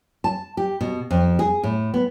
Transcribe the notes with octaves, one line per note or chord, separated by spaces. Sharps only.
A5
G4
B2
F2
G#4
A2
B3